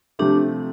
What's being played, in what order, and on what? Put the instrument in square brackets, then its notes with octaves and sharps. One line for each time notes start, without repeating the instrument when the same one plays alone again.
[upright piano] C3 F3 A3 [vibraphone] D4 G4